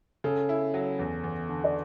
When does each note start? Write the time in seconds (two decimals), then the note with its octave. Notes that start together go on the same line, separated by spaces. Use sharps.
0.24 C#3 A4
0.49 E4
0.74 F#3
0.99 E2
1.24 E2
1.49 D3
1.64 D5